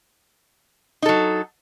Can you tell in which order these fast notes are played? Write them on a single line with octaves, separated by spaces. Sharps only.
D#4 A4 F#3